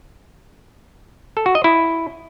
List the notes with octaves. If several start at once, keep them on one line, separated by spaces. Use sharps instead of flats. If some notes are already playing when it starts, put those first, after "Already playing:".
A4
F#4
D#5
E4